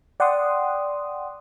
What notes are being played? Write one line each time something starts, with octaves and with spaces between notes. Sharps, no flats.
D5 F#5 G5 C6 D#6